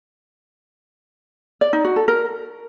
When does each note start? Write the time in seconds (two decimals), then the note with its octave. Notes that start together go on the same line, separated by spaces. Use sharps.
1.61 D5
1.73 D#4
1.85 F#4
1.96 A4
2.08 A#4